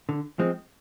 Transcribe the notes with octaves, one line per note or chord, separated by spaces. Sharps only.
D3
F3 G#3 C4